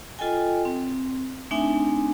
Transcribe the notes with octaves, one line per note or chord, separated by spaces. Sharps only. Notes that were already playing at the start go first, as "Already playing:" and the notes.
F4 A4 D#5 G5 G#5
C4
A3 C4 D4 D#4 E5 G#5